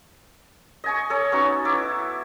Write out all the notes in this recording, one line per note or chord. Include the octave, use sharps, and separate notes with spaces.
D#5 G#5 C#6
A4 C#5
B3 C#4 D#4 F#4
E4 D6